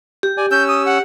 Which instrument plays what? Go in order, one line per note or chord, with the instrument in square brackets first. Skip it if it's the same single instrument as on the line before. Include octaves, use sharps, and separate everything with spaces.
[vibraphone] G4
[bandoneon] D5 G#5
[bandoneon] C#4 E6 [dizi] G6
[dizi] D#6
F#5